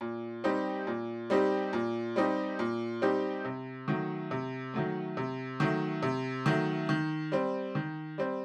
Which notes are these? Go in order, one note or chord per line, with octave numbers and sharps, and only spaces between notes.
A#2
G3 C4 D#4 G4
A#2
G3 C4 D#4 G4
A#2
G3 C4 D#4 G4
A#2
G3 C4 D#4 G4
C3
D#3 F#3 A3
C3
D#3 F#3 A3
C3
D#3 F#3 A3
C3
D#3 F#3 A3
D#3
G3 C4
D#3
G3 C4